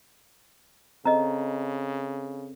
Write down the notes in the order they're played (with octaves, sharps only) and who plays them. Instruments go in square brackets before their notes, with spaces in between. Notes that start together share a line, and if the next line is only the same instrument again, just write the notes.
[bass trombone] C#3 [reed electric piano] C4 A4 [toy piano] D#5 A#5